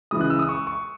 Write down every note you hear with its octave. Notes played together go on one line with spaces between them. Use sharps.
C#3 E3 G#3 D#6
F#6
E6
D#6
C#6
C#6